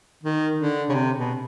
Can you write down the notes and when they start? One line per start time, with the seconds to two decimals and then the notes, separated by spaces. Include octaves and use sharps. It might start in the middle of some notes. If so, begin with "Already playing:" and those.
0.23 D#3
0.59 D3
0.89 C#3
0.94 C3
1.17 B2